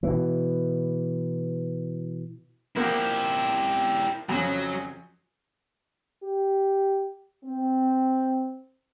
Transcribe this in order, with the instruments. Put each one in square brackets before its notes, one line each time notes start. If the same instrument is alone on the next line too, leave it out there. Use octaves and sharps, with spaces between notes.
[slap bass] B2 E3
[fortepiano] F3 A#3 F#5 [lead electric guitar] E4 G4
[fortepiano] F2 C#3 [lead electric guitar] F#3
[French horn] G4
C4